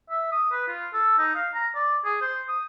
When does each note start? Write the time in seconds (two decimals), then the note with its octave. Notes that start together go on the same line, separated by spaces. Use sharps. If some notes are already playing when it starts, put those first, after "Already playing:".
0.10 E5
0.32 D#6
0.52 B4
0.68 F4
0.93 A4
1.18 D#4
1.35 F5
1.54 A#5
1.75 D5
2.05 G#4
2.21 C5
2.48 D#6